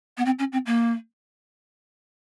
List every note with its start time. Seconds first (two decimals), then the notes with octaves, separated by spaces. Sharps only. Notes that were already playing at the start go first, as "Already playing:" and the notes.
0.17 B3
0.25 C4
0.39 C#4
0.52 C4
0.66 A#3